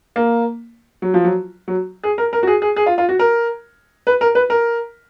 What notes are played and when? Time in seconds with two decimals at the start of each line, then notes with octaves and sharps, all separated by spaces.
0.16 A#3
1.02 F#3
1.14 F3
1.24 F#3
1.68 F#3
2.04 G#4
2.18 A#4
2.33 A#4
2.43 F#4
2.47 G#4
2.62 G#4
2.76 G#4
2.86 F4
2.98 F4
3.09 F#4
3.19 A#4
4.07 B4
4.21 A#4
4.35 B4
4.50 A#4